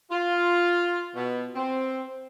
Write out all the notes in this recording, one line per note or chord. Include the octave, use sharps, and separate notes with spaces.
F4
B2
C4